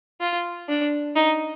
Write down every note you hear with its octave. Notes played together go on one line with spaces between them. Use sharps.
F4
D4
D#4